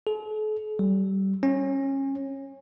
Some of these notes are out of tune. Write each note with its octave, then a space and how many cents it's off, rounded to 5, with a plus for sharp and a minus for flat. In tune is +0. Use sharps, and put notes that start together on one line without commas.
A4 -45
G3 -25
C#4 -25